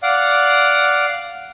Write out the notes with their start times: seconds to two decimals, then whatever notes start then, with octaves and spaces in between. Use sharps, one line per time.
0.03 D5 F5 F#5